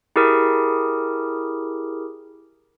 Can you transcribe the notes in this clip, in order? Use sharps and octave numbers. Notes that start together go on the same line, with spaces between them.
E4 G4 G#4 A#4